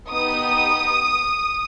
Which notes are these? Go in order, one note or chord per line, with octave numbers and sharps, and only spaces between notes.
B3 D#4 G4 D#6